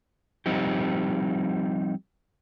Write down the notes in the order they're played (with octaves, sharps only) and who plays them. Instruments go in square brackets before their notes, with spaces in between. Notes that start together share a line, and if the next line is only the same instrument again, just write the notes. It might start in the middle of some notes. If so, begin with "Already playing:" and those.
[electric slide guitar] F3 G3 C4 D#4 G4